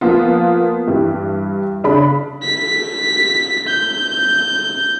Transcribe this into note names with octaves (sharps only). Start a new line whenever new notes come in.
F3 A#3 B3 F4
G2 E3 G3
C#3 D4 B5
B6
G6